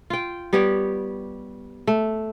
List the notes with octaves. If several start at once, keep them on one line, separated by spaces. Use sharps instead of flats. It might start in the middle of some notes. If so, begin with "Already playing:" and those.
F4 G5
G3 B3 G4 C#5
A3